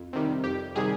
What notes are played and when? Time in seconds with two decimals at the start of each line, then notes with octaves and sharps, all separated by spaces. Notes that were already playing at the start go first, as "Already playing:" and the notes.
Already playing: F2
0.13 C3 D#3 G3
0.44 F2 G4
0.76 C3 D#3 G3 G#4